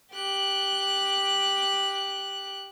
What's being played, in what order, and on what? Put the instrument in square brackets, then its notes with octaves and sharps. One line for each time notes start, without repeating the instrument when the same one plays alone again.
[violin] G4 F#6